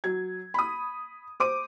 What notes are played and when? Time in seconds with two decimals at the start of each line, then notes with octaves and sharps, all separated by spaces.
0.04 F#3 G#6
0.54 B5 D#6
1.40 C5 D6 D#7